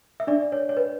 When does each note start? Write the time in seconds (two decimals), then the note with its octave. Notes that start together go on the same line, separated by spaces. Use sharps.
0.20 E5
0.27 D4 D5
0.52 C#5
0.69 C#5
0.77 B4